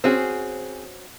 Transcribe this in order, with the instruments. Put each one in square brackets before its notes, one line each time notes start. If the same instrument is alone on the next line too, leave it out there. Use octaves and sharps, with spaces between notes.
[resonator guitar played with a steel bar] C4 G#4 [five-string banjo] C#4 F#4 C5